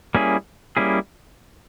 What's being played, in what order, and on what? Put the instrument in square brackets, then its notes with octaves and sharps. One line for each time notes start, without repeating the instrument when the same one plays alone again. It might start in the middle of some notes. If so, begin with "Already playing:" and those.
[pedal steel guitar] G3 A#3 C#4 E4 G#4
G3 A#3 C#4 E4 G#4